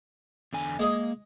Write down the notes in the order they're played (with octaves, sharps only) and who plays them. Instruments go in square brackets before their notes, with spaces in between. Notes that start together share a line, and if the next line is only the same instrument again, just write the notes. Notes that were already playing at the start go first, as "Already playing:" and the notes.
[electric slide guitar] E2 D3 G#5
[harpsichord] G#3 G#4 D#5 [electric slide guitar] A#3